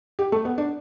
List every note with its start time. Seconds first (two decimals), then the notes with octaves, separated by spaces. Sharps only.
0.19 G4
0.32 A3
0.45 B3
0.58 D4